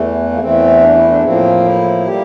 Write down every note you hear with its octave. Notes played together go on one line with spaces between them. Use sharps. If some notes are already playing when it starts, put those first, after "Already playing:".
Already playing: E2 E3 A3
A#3
E2 E3 A3 C4
D4
E4
D4
A2 F3 A#3 C4
E4
G3 A#3 G4